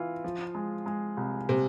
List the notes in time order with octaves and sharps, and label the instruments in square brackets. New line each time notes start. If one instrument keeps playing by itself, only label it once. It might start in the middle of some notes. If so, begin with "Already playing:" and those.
Already playing: [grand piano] E3 F4
F3
G#3
G#3
C2
[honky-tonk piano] C3